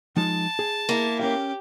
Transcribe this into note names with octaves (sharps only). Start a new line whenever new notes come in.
F3 G#3 D#4 A5
G#4
A#3 E4
C#4 G4 A#4 F5